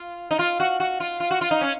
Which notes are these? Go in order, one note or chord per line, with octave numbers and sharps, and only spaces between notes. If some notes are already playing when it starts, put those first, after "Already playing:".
Already playing: F4
D#4
F4
F#4
F#4
F4
F4
F#4
F4
D#4
C#4